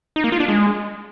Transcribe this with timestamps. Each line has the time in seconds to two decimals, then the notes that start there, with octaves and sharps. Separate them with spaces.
0.16 D#4
0.24 A#3
0.32 F4
0.40 D4
0.48 G#3